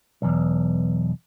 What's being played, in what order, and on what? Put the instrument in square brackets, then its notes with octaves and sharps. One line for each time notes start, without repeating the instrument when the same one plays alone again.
[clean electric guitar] B1 E2